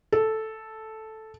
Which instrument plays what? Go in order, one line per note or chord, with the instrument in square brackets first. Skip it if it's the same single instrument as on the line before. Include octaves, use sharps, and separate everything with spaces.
[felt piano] A4